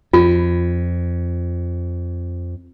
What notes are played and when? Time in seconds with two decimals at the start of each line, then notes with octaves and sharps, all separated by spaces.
0.13 F2 F4